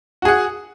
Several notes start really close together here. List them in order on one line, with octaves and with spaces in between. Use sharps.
F#4 G#4 F#5